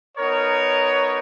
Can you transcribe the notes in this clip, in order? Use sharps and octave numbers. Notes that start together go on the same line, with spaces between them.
B3 D#4 A#4 C#5